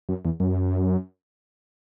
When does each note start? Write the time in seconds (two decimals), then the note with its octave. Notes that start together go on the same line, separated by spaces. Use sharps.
0.09 F#2
0.25 E2
0.40 F#2